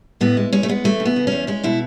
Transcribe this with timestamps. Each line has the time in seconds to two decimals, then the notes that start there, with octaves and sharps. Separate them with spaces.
0.21 A2 B3
0.37 G#3
0.53 G#3 C#4
0.63 A3
0.68 G#3 B3
0.84 E3 A3
1.00 C#3
1.05 B3
1.16 C#3
1.27 E2 C#4
1.47 G#3 C#4
1.63 B2 E4